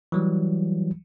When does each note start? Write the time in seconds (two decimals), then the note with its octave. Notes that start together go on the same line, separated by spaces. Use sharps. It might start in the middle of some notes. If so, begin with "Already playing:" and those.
0.12 E3 F#3 G3